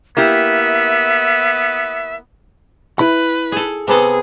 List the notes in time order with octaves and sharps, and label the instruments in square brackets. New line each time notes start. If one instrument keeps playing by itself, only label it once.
[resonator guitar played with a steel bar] A#3 E4 G4 [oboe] B3 [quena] E5
[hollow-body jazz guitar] E4 B5 [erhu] B4
[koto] G#4 A4
[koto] C3 B3 A4 [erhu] G#4